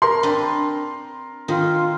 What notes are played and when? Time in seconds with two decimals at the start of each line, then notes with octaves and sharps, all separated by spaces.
0.02 A#4 A#5 C6
0.23 C4 D4 B4
1.48 D#3 C4 D#4 F4